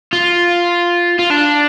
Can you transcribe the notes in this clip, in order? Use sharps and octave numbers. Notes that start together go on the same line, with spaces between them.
F4
F4
D4